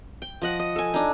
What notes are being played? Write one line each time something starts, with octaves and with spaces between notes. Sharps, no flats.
G5
F3 D#5 F#5
D#5
A4 G#5
D4 D#4